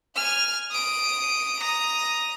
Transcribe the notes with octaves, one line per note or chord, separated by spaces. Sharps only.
G#5 F6
D#6 D7
A#5 D#6